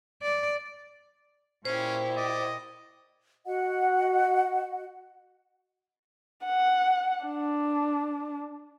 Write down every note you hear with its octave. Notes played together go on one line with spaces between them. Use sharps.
D5
A#2 C#4 E4 G4 C5
D5 D#5
F#4 D#5 F#5
F#5
D4